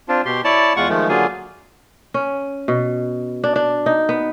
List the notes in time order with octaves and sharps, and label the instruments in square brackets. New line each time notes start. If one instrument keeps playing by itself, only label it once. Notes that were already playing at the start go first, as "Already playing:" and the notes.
[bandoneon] C4 D4 F4
B2 G4 C6
E4 C#5 D5 A5
E2 G#3 F4 F#5 C#6
D#3 F3 G#3 A3
D3 F#3 A#3 F4 G#4
[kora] C#4
B2
D4
D4
D#4
B3